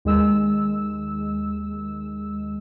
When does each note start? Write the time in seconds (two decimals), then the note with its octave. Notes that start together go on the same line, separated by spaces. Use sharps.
0.05 D#2 G#3 E6